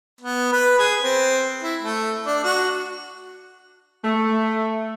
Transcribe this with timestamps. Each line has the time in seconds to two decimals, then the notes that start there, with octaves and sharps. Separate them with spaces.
0.21 B3
0.53 B4
0.79 G#4
1.01 C4
1.63 E4
1.81 A3
2.26 D4
2.44 F#4
4.04 A3